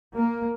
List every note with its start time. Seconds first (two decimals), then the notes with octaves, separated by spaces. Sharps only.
0.16 A#3